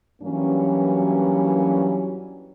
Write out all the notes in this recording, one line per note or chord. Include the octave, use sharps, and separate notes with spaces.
G2 E3 F#3 G3 A#3 C#4